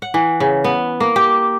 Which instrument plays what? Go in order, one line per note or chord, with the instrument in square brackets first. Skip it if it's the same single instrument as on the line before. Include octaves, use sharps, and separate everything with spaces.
[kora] F#5
E3
C#3
B3
A#3
G4